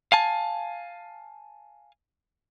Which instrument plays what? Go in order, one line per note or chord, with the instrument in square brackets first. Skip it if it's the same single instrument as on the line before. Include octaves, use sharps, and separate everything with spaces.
[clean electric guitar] F5 G#5 A5